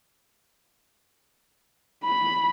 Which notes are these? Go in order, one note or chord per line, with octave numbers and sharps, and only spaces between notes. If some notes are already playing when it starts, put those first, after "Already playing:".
B5